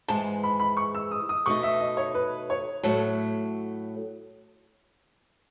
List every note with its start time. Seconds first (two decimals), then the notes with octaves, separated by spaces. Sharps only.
0.08 G#2 E3 G#3 A5
0.43 B5
0.60 B5
0.77 C#6
0.95 E6
1.11 D#6
1.29 D#6
1.46 B2 A3 D#4 C#6
1.63 E5
1.81 D#5
1.97 C#5
2.14 B4
2.50 C#5
2.83 A2 F#3 A3 A4